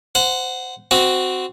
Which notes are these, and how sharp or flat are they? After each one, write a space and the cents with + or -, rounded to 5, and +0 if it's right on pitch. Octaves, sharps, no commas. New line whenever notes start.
C5 -20 F#5 +0
C4 -10 F#4 +0